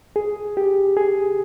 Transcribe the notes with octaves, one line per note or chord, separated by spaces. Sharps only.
G#4
G4
G#4